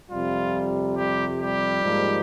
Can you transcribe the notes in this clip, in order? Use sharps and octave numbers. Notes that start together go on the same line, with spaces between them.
F2 C3 G3 F4
G3 G4
G3 G4
G#2 F3 A#3 D#4